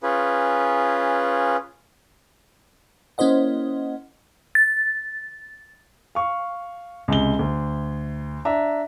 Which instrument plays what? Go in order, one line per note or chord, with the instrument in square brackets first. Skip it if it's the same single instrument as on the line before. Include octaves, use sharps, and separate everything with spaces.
[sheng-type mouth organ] C#4 F4 G#4 B4
[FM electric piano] A#3 C#4 E4 C5 D#5 F#5
[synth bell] A6
[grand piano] F5 C#6
C#2 C3 G7
D2
D4 E5 A#5